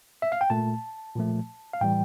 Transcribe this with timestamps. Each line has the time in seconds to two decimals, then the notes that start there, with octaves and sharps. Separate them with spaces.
0.22 E5
0.32 F5
0.41 G5
0.50 A#2 A3 A5
1.15 A#2 F3 A3
1.73 F5
1.81 A2 E3 G3 G5